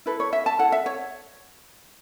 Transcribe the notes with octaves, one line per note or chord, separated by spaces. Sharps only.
E4 A4 B4
C#5
E5
A5
E4 A4 F#5
E5
C#5